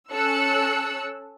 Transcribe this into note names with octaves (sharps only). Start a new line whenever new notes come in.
C#4 A4 E6 F#6 C#7